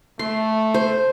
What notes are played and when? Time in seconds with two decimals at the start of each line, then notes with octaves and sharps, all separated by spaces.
0.19 A3 C6
0.74 C5